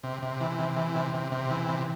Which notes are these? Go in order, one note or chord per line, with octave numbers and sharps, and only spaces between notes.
C3
C3
E3
C3
E3
C3
C3
C3
E3
C3